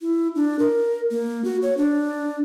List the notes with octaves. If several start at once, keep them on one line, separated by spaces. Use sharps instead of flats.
E4
D4
A#4
A#3
F#4
C#5
D4